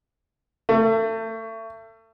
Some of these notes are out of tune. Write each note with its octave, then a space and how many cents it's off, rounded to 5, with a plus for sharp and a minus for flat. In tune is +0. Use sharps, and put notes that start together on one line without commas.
A3 +30